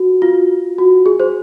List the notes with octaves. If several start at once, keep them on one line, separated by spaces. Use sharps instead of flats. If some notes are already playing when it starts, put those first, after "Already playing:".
Already playing: F#4
F4
F#4
G#4
C5